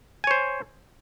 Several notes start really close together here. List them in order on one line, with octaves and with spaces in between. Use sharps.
G#5 C#5 C5